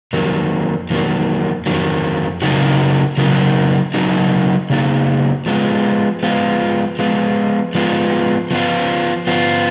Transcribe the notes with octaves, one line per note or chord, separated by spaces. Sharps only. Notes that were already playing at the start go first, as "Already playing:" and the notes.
F2 D#3 F#3 A#3
F2 D#3 F#3 A#3
F2 D#3 F#3 A#3
C#3 F#3 A#3 D#4 F#4
C#3 F#3 A#3 D#4 F#4
C#3 F#3 A#3 D#4 F#4
C#3 F#3 A#3 D#4 F#4
F3 G#3 B3 F4
F3 G#3 B3 F4
F3 G#3 B3 F4
F3 G#3 B3 F4
F3 B3 F4
F3 B3 F4